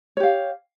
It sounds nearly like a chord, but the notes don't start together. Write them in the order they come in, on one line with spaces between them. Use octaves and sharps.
C#5 G4 F5